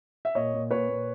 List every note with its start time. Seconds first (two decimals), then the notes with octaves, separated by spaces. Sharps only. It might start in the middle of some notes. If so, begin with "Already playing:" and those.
0.25 E5
0.35 A#2 C#5 D#5
0.54 A#2
0.71 A#2 B4 C#5
0.89 A#2